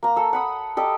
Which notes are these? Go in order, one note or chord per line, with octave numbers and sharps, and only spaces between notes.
A#3 A#5
A4 E6
F#5 B5 D#6
G4 A4 D#5